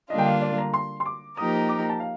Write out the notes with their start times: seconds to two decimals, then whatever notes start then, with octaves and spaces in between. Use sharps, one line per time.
0.10 D3 G3 A#3 D4 F4 D#5
0.18 G5
0.26 F5
0.42 D5
0.58 A#5
0.74 C6
1.00 C6
1.06 D6
1.37 F3 A#3 D#4 G4 A#4 D#6
1.69 D6
1.80 A#5
1.90 A5
2.00 F5